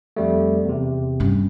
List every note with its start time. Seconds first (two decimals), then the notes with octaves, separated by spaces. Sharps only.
0.16 F2 G3 A3
0.65 E2 C3
1.20 G2 C#4